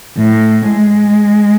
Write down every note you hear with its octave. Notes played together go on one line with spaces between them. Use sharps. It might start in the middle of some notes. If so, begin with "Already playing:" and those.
A2
G#3